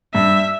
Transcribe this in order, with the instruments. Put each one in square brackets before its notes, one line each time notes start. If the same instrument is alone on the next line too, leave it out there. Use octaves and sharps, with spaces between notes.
[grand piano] G2 [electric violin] E5